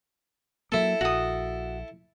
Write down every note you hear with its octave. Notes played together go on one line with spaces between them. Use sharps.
F#3 A#3 E4 A4
A#1 F#4 D#6